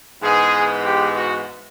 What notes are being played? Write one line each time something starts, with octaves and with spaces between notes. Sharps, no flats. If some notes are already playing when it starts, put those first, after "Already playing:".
G#2 E3 G#3 B3 G#4
G4
F#4